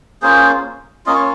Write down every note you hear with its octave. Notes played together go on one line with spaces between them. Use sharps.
A#3 C#4 F4 G#4 C5
A#3 C#4 F4 D#5
C#5